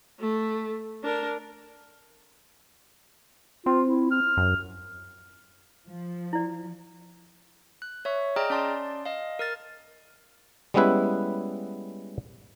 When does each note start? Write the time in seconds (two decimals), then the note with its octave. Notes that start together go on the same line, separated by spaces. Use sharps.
0.19 A3
1.04 D4 A#4
3.66 C4 F4
3.88 E4
4.11 F6
4.37 F#2
5.87 F3
6.33 E4 D5
7.82 F#6
8.05 C#5 E5 C#6
8.36 G#4 D5 D#5 G5 A#5 F6
8.50 C#4 D5 A5 C6
9.05 D#5 F5
9.39 A#4 F6 A6
10.74 G3 G#3 B3 C#4 E4 B4